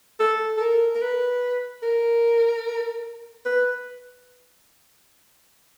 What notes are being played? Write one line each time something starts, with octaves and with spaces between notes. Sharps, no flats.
A4
A4
A#4
A#4
B4
A#4
B4